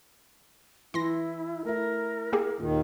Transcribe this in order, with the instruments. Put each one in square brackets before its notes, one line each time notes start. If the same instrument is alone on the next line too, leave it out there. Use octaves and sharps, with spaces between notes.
[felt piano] E3 [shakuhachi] E4 [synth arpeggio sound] C6 A#6
[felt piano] A3 E4 [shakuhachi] A#4
[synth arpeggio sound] A#3 G4 G#4
[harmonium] D#2 D#3 [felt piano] A#2